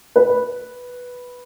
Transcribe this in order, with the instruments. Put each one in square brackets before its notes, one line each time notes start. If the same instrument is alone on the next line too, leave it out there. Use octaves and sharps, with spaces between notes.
[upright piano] B4